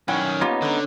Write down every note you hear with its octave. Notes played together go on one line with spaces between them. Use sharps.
F#2 D#3 C#4 E4 F#5 G5
A#3 B3 D#4 F4 G4
D3 G#3 A#5